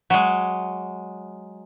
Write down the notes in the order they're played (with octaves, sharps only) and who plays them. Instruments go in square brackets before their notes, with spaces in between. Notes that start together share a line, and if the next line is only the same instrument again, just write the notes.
[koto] F#3 G#3